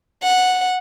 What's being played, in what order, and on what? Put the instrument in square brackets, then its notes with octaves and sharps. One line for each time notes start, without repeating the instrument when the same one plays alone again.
[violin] F#5